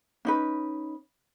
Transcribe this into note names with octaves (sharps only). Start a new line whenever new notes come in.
C#4 D#4 B4